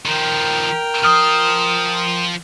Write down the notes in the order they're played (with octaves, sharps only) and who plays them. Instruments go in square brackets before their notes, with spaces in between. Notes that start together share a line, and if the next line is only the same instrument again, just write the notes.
[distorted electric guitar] D#3 F3 [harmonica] A#4 G5
[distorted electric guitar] F3 C5 [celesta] D#6 F6